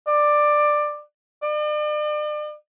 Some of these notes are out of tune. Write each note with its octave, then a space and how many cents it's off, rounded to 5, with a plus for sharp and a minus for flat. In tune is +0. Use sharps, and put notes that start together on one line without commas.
D5 +15
D5 +40